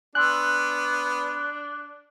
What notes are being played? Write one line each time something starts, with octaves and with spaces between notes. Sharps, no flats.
B3 D4 G#5 C6 E6 F#6